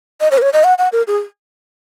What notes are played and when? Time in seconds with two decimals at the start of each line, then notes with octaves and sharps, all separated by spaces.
0.21 D#5
0.31 C#5
0.38 A#4
0.42 C#5
0.53 D#5
0.64 F#5
0.78 F#5
0.92 A#4
1.07 G#4